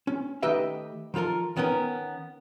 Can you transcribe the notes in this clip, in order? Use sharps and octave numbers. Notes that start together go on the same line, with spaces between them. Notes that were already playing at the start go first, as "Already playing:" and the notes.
C#4
D#3 A3 G4 B4 D#5 E5
D#3 F3 F4 A4 A#4
D#3 B3 C#4 A#4